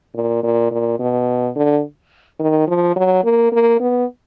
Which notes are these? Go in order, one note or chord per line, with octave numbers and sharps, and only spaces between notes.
A#2
A#2
A#2
B2
D3
D#3
F3
F#3
A#3
A#3
B3